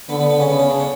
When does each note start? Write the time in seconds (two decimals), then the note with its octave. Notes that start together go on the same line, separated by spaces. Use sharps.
0.09 D3 B3
0.20 B3
0.30 B3
0.39 C#3 C#4
0.49 B3
0.59 C#4
0.70 D4
0.79 C#4